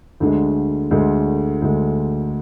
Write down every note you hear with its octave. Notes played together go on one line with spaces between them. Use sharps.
D2 D3 G#3
D2 D3 G#3
D2 D3 G#3